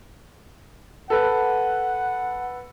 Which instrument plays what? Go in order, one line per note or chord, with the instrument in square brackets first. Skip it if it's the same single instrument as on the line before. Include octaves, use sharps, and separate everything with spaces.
[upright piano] A4 B4 [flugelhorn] F#5